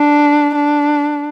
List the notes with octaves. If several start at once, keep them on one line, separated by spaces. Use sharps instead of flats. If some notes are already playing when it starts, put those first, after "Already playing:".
Already playing: D4
D4